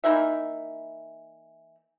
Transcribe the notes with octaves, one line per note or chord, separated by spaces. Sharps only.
E3 A#3 D#4 E5